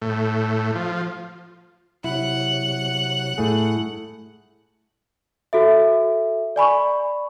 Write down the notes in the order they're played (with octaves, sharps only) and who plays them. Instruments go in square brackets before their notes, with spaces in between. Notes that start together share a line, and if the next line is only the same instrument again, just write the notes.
[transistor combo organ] A2
F3
[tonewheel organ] C3 F#3 [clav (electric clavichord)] E4 [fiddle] F#5
[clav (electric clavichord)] A2 A3 G#4
[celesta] F#4 A4 E5
D5 G#5 B5 C#6